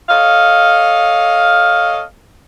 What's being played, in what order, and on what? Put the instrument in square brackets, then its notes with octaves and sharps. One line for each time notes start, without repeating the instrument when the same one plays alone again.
[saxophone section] A4 C#5 D#5 F5